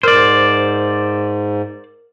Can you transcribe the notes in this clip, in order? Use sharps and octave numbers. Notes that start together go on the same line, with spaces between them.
G#2 A#4 C5 D5 F6